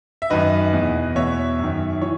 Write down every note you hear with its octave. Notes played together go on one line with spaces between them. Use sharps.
E5
F#2 D#3 B4 D#5
E2 B2
E2 B2 C#5 E5
F#2 D#3
E3 C#5